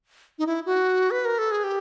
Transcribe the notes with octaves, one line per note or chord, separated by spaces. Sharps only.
D#4
E4
F#4
B4
A#4
A4
G#4
G4